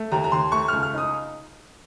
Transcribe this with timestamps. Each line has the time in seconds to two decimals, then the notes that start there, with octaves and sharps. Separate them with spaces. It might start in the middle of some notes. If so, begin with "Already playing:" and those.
Already playing: A3
0.12 D#2 A#5
0.24 A#5
0.32 D#2 C6
0.52 A3 C#6
0.68 C#2 F6
0.83 F6
0.94 D#4 D#6